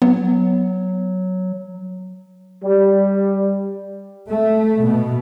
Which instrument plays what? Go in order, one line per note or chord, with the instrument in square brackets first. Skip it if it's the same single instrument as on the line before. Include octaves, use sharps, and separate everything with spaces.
[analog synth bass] F#3 [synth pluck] B3
[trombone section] G3
[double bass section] A3
B2